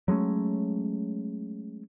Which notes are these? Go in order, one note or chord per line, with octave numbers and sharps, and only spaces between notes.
F#3 G#3 A3 C#4